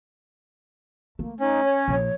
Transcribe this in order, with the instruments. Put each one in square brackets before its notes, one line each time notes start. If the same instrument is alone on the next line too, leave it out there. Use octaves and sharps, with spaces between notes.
[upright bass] A3 [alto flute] A#3
[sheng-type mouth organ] C#4 [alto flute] D#4
[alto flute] C#5
[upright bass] A#1